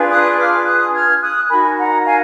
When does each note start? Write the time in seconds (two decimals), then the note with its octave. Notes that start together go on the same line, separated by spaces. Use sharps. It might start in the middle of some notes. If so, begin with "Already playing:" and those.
Already playing: D4 F4 G#4 B4
0.10 D#6 F#6
0.38 D6 F6
0.65 D#6 F#6
0.93 F6 G#6
1.21 D#6 F#6
1.49 D#4 F#4 A#4 G#5 B5
1.77 F#5 A#5
2.04 F5 G#5